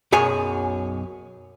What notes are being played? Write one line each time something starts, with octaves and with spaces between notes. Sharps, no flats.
B1 F#2 G#4 C#5 G#5